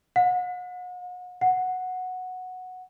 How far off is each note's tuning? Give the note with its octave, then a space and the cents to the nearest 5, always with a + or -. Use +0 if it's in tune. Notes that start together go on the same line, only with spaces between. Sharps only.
F#5 -40
F#5 -5